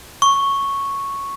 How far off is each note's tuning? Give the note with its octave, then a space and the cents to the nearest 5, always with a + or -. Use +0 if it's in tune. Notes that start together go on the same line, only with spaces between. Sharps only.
C#6 -5